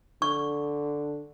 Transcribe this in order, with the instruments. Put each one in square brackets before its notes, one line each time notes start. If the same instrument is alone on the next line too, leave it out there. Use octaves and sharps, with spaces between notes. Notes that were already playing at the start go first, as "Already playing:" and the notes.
[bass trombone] D3 [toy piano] C#6